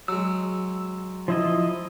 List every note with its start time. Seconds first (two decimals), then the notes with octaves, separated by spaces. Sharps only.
0.08 F#3 G#3 E6
1.28 F3 E4 D#5